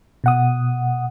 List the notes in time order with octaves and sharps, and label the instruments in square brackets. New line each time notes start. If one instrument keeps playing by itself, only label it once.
[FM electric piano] B2 F#5 D#6